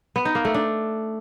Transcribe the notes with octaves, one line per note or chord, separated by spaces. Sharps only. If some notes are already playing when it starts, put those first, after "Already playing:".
B3
D#4
A#3
A3
D4